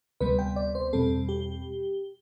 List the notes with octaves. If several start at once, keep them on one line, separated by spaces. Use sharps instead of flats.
D2 C3 G3 B3 B4
G5
D5
C5
E2 B2 G3 C4 A4
G4